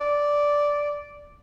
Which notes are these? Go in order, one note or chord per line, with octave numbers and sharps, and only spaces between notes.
D5